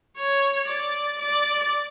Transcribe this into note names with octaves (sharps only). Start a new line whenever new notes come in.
C#5
D5
D5